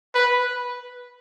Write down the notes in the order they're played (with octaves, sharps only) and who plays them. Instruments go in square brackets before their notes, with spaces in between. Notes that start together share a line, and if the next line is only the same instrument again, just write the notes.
[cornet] B4